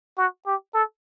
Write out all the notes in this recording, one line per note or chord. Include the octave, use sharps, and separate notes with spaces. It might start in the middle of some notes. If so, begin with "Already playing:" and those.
F#4
G4
A4